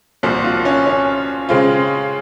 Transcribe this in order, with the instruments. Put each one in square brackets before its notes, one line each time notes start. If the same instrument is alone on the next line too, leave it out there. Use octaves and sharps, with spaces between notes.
[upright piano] C2 A#2 F3 C4 [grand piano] F#4
[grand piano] F4
C#4
C#4
[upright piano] C#3 G#3 C4 F4